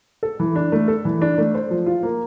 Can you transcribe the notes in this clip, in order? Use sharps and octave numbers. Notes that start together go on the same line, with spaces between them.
A4
E3
D4
A3
A4
E3
D4
A3
C5
F3
F4
A#3